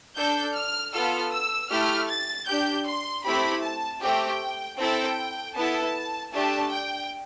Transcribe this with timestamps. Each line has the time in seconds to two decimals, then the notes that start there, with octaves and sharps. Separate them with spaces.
0.16 D4 A4 G6
0.55 F6
0.93 B3 F4 A4 F6
1.32 E6
1.71 A3 E4 G4 F6
2.09 A6
2.48 D4 G4 G6
2.87 C6
3.25 A3 C4 E4 G4 B5
3.63 A5
4.02 A3 C4 G4 G5
4.79 C4 E4 A4 G5
5.56 B3 E4 A4 A5
6.33 A3 D4 G4 A5
6.72 G5